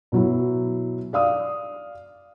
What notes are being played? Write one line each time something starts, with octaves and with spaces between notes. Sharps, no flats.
B2 F#3 E4
D5 F5 D#6